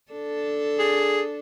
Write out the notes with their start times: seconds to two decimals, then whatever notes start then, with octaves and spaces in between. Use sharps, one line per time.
0.12 D4 A4
0.79 G#4